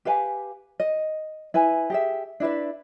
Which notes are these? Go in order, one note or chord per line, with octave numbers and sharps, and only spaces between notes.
G4 B4 F5 G#5
D#5
E4 B4 G#5
G4 G#4 E5
D4 E4 B4 E5